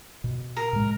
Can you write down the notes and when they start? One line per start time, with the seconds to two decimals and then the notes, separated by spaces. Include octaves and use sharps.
0.24 B2
0.57 A#4
0.73 A2 C3 G#3